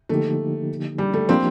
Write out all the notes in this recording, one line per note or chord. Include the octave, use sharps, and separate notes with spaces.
D3 F3 A3 A#3 D#4 G4
G3
A3
F3 A#3 C4 D4 G4